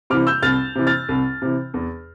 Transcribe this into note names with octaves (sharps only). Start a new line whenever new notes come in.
C3 E3 D6 F6
E6 G6
C2 F6 A6
C3 E3
F6 A6
C2
C3 E3
E2